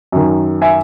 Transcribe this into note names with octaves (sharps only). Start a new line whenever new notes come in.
F#2 D#3
E5 G#5